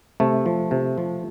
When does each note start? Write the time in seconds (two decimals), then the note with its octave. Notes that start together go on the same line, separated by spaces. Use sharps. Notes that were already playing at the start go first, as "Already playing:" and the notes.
0.20 C3 A3
0.46 F3
0.71 C3
0.98 F3